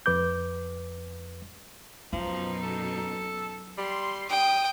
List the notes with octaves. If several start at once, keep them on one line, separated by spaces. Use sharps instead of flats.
F2 B4 D6 G6
F#2 B2 F3 F#3 D#4
A4
G3 C6
G3 G5 D#6